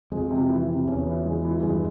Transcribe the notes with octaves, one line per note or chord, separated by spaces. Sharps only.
F2 G#3
C3
E3
C3
E2 C#4
E3
G#3
E3
E2 G2 G#3